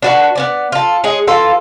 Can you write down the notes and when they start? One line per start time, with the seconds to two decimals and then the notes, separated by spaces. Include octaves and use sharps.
0.02 D4 F#4 B4
0.35 B3 C#4 D5
0.72 F4 A4
1.04 G#3 G#4 C#5
1.28 E3 F4 A4